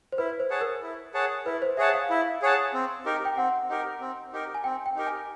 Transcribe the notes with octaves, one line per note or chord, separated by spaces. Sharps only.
C5
E4 B4
C5
G#4 C#5 F#5 A5
A#4
E4
G#4 C#5 F#5 A5
E4 B4
C5
G#4 C#5 E5 F#5 A5
F5
E4
G#4 C#5 F#5 A5
C4
D#4 G4 A#4
G5
C4 F#5
D#4 G4 A#4
C4
D#4 G4 A#4
G#5
C4 G5
G5
D#4 G4 A#4
G#5